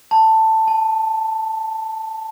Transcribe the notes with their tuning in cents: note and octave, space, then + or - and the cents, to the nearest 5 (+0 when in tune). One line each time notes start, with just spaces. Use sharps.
A5 +10
A5 -45